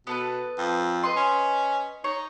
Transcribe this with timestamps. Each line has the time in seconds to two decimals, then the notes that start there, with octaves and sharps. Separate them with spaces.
0.07 B2 B3 A4 B4
0.58 F2
1.03 B4 D#5 C6
1.16 C#4
2.04 D#4 C#5